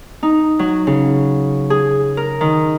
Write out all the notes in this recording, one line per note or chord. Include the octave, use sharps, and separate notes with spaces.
D#4
F#3
C#3
G#4
A#4
D#3